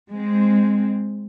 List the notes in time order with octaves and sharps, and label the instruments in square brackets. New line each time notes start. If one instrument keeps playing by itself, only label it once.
[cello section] G#3 C4